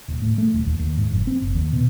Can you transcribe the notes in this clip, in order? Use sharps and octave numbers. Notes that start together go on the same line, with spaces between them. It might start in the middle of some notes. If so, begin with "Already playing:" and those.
D#1
A2
A3
D#1
D#2
D#2
G#2
F1
C4
F#1
D#2
B2